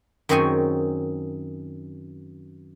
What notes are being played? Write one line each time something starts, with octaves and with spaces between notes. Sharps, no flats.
F#2 D#3 C4 G#4 C#5 G#5